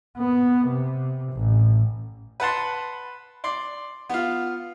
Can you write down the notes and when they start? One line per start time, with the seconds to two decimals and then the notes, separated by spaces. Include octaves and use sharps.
0.18 B3
0.68 C3
1.33 A1
2.40 B4 F#5 A5 C6
3.44 D5 C6
4.09 B3 F4